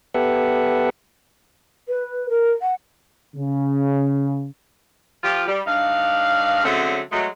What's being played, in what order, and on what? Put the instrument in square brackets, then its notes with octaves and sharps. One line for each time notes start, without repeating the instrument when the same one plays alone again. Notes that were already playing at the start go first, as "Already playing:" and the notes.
[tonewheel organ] B3 G4 A4 B4 E5 F#5
[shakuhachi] B4
A#4
F#5
[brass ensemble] C#3
[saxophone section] F3 F4 G4
G3
G2 D4 D#4 F5
D3 F#3 G#3 A3 C4 C#4
F#3 G#3 A3